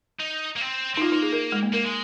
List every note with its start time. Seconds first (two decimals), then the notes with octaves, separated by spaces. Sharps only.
0.20 D#4
0.56 A#3
0.61 C4
0.96 C4 D#4
1.01 A#3 F4
1.12 D#4
1.22 G#4
1.32 A#4
1.52 G#3
1.63 A#3
1.73 A#3 A#4
1.84 G#3